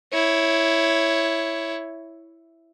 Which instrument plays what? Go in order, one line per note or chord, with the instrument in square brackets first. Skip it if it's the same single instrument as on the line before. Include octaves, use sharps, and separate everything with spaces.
[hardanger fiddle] E4 C#5